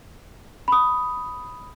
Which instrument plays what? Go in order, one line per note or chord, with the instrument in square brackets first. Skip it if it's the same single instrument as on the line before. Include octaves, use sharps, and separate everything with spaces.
[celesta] B5 D#6